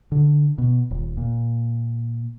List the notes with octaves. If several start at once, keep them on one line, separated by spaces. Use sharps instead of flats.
D3
B2
D#1
A#2